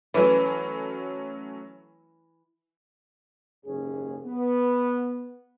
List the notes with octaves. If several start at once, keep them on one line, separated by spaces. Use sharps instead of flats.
E3 F#3 A3 C#4
F#1 D#2 G#2 C#4 G#4
B3